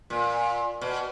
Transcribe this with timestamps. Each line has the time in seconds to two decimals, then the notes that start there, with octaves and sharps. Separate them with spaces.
0.10 A#2
0.81 B2